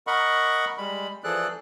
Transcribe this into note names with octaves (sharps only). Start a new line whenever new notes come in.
A#4 D#5 F#5 B5 C#6
G3 G#3 B5
E3 F3 G#4 A4 D5 F#6